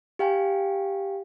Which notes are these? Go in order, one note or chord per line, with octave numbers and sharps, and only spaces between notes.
G4 F5 G5 G#5